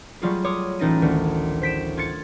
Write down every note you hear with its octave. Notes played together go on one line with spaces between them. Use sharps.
F#3 G3 A3 F4 F#4 G#4
C#5 C6 D6 D#6
A1 D#4 A6 A#6 D#7
D2 D#3
C5 B6 D7 E7
F4 G#6 A6 C#7